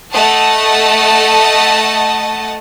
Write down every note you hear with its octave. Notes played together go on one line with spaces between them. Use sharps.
A3 D#5 F#5 A5